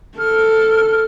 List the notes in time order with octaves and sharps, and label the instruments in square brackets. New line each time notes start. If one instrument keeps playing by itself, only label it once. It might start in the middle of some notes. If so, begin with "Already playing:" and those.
[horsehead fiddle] A4 [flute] F6